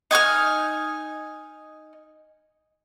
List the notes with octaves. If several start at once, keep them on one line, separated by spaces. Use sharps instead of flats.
D#4 G#5 D6 F6